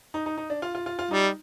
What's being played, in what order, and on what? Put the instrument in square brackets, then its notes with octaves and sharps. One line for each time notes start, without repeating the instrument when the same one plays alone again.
[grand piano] D#4
D#4
D#4
D4
F4
F4
F4
F4
[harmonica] G3 [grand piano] D#4